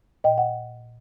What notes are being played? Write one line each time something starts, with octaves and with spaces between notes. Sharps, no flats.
A#2 D#5 G5
F#5